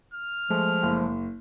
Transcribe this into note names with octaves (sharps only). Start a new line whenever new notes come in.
F6
F3 G#3 A3
F#1